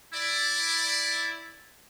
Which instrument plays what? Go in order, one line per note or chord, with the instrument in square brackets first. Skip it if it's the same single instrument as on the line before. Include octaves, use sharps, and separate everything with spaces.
[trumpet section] E4 D5